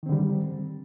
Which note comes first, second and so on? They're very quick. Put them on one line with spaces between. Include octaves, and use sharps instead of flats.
D#3 C4 D3 G3